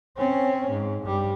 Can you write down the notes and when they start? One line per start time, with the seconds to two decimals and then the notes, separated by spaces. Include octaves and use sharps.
0.18 C4 C#4
0.70 G#2
1.03 G2 G3